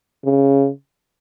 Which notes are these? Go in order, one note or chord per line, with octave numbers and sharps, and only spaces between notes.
C#3